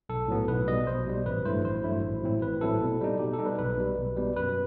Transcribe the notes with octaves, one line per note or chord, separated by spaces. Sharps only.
B1 A4
A2 F#3 B3
B1 B4
B2 G3 D#5
B1 C5
B2 G3
A1 B4
G2 F#3 A3 E4 C5
A1 C5
G2 F#3 A3 E4
A1
A2 F#3 C4 E4
A1 B4
A2 F#3 C4 E4 A4
B2
G3 D#4
B2 G4
A4
G3 D#4
B4
B1 B4
B2 G3
B1
B2 G3
F#2 B4